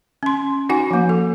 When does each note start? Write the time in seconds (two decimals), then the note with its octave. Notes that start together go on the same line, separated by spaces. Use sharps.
0.23 C#4 C6
0.69 D#4 F#4 F#5 G#5
0.91 F3 A#3
1.09 A4